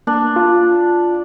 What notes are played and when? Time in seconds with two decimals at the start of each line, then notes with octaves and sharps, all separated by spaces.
0.07 A#3 D4
0.36 F4